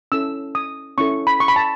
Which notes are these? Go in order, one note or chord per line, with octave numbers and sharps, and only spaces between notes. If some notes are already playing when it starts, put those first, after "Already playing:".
C#4 E4 A4 E6
D#6
C#4 E4 A4 C#6
B5
C#6
B5
A5